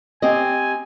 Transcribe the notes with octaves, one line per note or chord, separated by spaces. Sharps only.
C4 G4 D#5 G#5